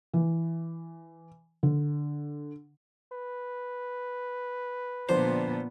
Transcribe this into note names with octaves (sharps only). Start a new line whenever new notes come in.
E3
D3
B4
A#2 D3 F3 B3 D4 C5